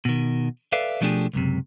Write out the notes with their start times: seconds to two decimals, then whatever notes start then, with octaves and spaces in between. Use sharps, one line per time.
0.05 B2 D#3
0.72 A4 B4 D5 E5 F5
1.01 B2 F3 A3 D4 G4 G#4
1.33 C#2 F#2 C3